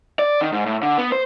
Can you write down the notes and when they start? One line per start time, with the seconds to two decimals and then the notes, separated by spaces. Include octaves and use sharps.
0.19 D5
0.41 D#3
0.52 G#2
0.66 A2
0.83 D3
0.98 B3
1.12 C5